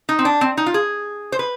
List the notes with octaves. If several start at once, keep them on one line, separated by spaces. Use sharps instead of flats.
D#4
C4
D4
C4
D#4
F4
G#4
C5
B4